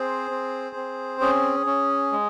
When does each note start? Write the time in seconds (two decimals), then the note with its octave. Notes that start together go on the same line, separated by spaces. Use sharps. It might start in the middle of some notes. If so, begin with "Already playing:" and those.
Already playing: C4 G#4 C5
0.31 C4
0.76 C4
1.21 C#4 G#4
1.66 C#4
2.12 G#3